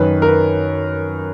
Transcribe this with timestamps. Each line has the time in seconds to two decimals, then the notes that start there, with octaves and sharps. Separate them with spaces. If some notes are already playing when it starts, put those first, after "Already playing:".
Already playing: F#2 D#3 B4
0.22 A#4
0.28 B4